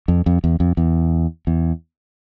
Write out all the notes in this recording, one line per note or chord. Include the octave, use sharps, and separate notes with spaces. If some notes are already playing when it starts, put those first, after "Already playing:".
F2
F2
E2
F2
E2
E2